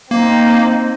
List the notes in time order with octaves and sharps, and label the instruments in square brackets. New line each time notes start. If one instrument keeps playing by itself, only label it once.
[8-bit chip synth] A#3 [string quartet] C4 D#4